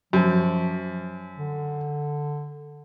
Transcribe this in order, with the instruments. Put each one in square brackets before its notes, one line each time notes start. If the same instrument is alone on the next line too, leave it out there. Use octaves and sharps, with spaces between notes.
[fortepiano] F#2 [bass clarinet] F3
[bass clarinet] D3